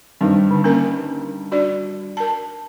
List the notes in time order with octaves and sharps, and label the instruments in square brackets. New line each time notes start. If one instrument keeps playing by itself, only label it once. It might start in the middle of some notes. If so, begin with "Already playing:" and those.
[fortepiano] G2 D#3 C4
[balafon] D3
A#3 C#4 A#4
D4 F#4 D5
A#4 A5